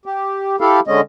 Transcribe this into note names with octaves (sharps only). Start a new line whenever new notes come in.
G4
E4 G4 A4 F5
D3 G#3 C#4 D#5